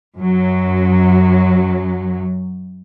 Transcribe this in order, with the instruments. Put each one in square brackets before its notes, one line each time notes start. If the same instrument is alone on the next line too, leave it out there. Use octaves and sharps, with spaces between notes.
[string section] F#2 F#3